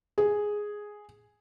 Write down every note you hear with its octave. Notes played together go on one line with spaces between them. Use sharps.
G#4